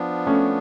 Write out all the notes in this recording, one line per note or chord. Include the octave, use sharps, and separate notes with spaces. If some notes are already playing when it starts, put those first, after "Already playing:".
Already playing: F3 B3 D4
A3 C#4